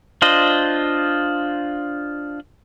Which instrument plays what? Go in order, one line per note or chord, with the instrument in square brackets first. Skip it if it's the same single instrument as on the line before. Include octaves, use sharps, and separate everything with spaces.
[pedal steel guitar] D4 F4 C5 D#5